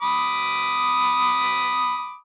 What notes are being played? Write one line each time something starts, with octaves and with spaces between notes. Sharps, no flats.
B5 D6 D#6